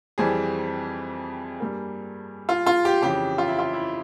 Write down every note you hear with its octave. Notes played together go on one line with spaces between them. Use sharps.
F2 E3 G3 C4 G#4
G2 G3 A#3
F4
F4
G4
F2 C#3 E3 G4
F4
E4
F4
E4